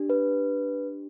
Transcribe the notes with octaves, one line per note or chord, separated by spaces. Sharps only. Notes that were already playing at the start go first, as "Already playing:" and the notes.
Already playing: D4 G4
B4